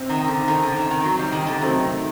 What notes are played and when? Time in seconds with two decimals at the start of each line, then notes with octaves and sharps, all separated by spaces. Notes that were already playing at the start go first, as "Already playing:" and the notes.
Already playing: C3 C4
0.09 D#3
0.28 D3
0.48 D#3
0.62 D3
0.76 D#3
0.90 D#3
1.04 F#3
1.19 G3
1.32 D#3
1.47 D3
1.61 C3 D#3 F#3 A3 C4 D#4